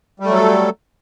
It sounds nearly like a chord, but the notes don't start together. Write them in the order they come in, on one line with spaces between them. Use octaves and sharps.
G3 A3 F#3 A4